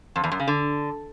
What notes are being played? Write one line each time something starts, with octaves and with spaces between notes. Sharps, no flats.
F2
E2
F#2
C#3
D3